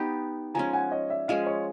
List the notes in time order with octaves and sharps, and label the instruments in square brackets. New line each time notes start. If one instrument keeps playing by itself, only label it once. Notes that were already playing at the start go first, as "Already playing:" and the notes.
Already playing: [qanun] B3 D#4 G4
[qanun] F3 G#3 C#4 [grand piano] G#5 A#5
[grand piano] F#5 G#5
C#5 D#5
D5 E5
[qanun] F3 G#3 C#4 [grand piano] D#5 F5
[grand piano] C#5 D#5